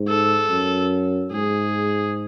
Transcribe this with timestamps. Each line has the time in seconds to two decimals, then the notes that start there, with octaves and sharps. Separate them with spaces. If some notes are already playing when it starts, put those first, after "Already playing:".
Already playing: G#2
0.08 A4
0.50 F#2
1.32 G#2 G#4